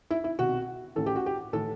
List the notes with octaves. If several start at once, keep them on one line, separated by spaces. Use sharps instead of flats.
E4
E4
C2 B2 F#4
A1 A2 E3 A4
G4
F#4
G4
A2 E3 A4